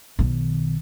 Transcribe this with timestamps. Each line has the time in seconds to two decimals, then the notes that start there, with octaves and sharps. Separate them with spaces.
0.19 B1 D#3